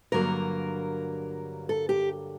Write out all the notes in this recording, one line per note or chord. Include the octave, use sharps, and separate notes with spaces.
G2 D3 F#3 A#3 A#4
A4
G4